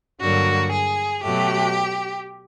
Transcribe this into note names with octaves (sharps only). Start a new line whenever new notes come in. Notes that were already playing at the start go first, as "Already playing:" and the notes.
G2 D3 F#3 A#3 F#4
G#4
B2 F#3 A3 G4